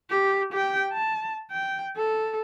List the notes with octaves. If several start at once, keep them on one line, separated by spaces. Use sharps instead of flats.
G4
G4 G5
A5
G5
A4